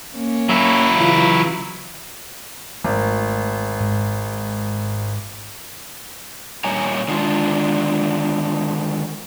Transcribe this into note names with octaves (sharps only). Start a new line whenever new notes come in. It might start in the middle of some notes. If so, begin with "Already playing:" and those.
A#3 C#4
F#3 E4
C#3 E3 F4
G#1 A3
G#2
A#2 G3 C#5 G#5 A#5
D3 D#3 G#3 D4 F4